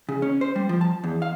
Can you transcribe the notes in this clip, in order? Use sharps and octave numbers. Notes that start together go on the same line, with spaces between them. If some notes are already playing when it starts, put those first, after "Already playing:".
C#3
C#4
C5
G3
F3
A5
E2
F5